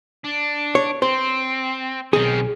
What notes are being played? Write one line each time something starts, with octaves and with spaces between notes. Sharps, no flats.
D4
C#5
C4 C5
B1 D#3 C4 G#4